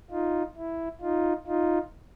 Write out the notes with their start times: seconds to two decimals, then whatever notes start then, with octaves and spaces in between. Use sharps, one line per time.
0.11 D#4 F4
0.57 E4
1.01 D#4 F4
1.47 D#4 F4